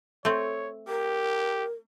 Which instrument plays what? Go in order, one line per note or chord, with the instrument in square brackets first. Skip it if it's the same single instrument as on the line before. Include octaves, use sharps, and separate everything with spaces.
[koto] A3 C4 [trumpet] C#5
[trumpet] G4 [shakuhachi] A#4